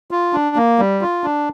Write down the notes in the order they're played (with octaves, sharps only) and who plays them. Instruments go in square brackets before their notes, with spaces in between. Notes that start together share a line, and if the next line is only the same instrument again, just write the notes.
[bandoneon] F4
D4
A#3
G3
F4
D4